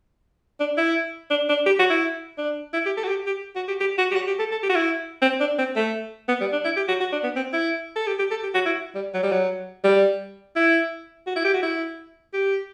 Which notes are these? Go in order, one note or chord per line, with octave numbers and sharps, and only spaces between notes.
D4
E4
D4
D4
G4
F#4
E4
D4
E4
G4
A4
F#4
G4
G4
F#4
G4
G4
F#4
G4
F#4
G4
A4
A4
G4
F#4
E4
C4
D4
C4
A3
B3
G3
D4
E4
G4
F#4
F#4
D4
B3
C4
E4
A4
G4
G4
A4
G4
F#4
E4
G3
F#3
G3
F#3
G3
E4
F#4
E4
G4
F#4
E4
G4